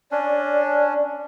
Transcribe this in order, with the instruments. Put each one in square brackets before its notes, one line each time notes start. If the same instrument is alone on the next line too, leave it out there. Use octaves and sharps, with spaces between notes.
[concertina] C#4 D4 [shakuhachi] D5